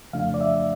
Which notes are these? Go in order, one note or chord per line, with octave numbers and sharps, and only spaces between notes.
F2 C#3 F3 A3 D4 F5
D5
E5